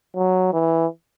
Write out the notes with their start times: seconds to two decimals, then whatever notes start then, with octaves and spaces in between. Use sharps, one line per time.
0.15 F#3
0.53 E3